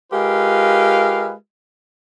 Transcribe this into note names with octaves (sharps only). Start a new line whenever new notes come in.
G#3 F4 G4 A#4 B4 F5